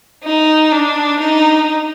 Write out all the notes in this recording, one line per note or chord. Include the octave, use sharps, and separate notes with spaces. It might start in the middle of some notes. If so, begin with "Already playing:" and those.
D#4
D4
D#4